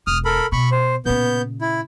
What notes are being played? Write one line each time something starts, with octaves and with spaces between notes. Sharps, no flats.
E1 D#6 F6
A4 A#4 B5
B2 B5 C#6
C5
A#2 C#3 B3 G6
E4